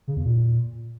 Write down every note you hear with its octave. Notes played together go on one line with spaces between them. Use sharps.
C#3
E2
A#2